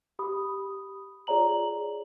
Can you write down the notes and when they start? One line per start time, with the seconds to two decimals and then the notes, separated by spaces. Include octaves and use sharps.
0.19 G4 B5 D#6
1.27 F4 G#4 C#5 D5 A#5 F#7